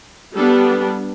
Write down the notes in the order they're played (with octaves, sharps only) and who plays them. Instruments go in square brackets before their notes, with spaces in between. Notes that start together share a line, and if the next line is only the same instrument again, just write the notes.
[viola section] G3 B3 D4 A4